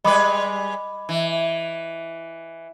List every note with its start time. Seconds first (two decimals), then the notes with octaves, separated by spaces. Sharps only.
0.04 G3 G#3 B4 D#5 B5 D6
1.09 E3